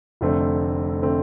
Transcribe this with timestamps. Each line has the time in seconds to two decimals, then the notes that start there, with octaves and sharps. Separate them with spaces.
0.21 F1 F2 D3 A3 C4
1.02 D3 A3 C4